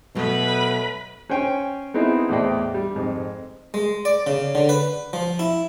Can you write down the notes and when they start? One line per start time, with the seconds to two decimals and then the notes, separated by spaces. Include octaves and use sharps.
0.15 B2 F#3 A3 B4 B5
1.29 C#4 C5 C#5 G5 G#5
1.94 B3 C4 D#4 E4 G#4
2.29 E2 A2 C5 D5 D#5 G5
2.74 G3
2.94 F2 G#2
3.74 G#3
4.05 D5
4.27 C#3
4.55 D3
4.69 B4
5.13 F3
5.39 E4